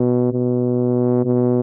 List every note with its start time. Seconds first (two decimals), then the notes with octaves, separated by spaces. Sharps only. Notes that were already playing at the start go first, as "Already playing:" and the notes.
Already playing: B2
0.33 B2
1.25 B2